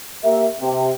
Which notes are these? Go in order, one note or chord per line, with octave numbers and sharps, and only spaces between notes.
A#3 G4 A#4 E5
C3